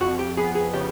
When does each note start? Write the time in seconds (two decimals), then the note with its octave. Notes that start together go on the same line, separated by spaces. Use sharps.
0.01 F2 F#4
0.19 G4
0.37 B3 G#4
0.55 G#4
0.73 C#3 G4